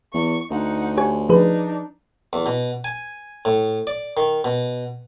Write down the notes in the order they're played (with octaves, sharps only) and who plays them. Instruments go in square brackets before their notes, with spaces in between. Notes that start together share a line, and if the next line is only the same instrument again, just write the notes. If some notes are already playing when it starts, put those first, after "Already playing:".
[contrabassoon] E2 [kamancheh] C#6
[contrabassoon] D2 [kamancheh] D#4 F#5
[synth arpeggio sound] G4 C#5 G#5
[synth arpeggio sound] F3 G#4 B4 [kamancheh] D4 D#4
[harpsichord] E2
B2
G#5
A2
D5
D#3
B2